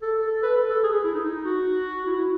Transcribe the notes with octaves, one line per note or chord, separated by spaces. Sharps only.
A4
A4
B4
A4
A4
G#4
G#4
E4
D#4
D#4
F#4
E4
E4